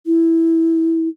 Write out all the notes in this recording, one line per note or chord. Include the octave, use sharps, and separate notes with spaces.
E4